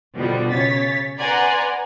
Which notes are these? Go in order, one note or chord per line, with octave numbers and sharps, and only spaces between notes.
B2 D3 F3 G3 B3
C#3 C#5 A6 B6
B4 D5 F#5 G#5 A#5 C6